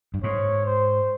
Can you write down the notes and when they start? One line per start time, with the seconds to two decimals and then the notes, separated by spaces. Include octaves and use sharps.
0.14 G2
0.24 G#2 C#5
0.66 C5